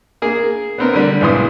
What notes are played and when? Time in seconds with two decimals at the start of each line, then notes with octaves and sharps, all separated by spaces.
0.22 A#3 G#4
0.78 B3 C4 A#4
0.93 D3 G3
1.21 B1 G#2 E3 C6 D#6